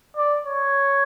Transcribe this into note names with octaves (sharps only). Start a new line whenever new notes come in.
D5
C#5